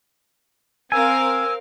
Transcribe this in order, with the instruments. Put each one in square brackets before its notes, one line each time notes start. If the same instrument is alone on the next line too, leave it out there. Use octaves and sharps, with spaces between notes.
[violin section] C4 A#4 F5 [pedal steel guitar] G#5 [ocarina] E6